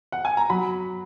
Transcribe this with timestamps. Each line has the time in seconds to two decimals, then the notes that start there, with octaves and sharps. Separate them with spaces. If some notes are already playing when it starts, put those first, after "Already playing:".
0.12 F#5
0.25 G#5
0.37 A#5
0.50 F#3 B5